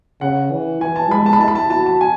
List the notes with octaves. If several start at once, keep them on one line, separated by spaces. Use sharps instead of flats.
C#3 F#5
E3
E3 G#5
A5
G#3 B5
A5
B5
E4 A5
B5
A5
F#4 A5
A5
G#5